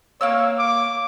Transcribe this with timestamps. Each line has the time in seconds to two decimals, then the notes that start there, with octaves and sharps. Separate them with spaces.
0.21 A#3 C#5 F5 E6
0.59 D6